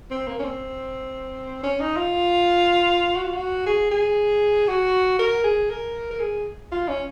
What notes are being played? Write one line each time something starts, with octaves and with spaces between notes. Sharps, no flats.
C4
A#3
C#4
C4
C#4
D#4
F4
F#4
F4
F#4
G#4
G#4
F#4
A#4
G#4
A#4
A#4
G#4
F4
C#4